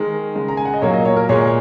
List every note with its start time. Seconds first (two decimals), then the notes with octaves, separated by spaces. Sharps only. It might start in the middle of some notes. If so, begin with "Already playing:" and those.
Already playing: D#3 G#3 A#4
0.35 C#3 G#3
0.48 A#5
0.57 G#5
0.65 F#5
0.74 D#5
0.82 A#2 F#3 A#3 C#5
0.94 D#5
1.05 C#5
1.17 A#4
1.29 A#2 G#3 C#5